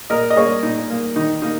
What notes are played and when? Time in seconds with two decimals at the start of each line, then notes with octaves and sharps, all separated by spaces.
0.10 A#2 A#4 D#5
0.30 D#5
0.36 A#3 G#4 C#5
0.63 A#2 D#4
0.90 A#3
1.16 D#3 D#4
1.42 A#3 D#4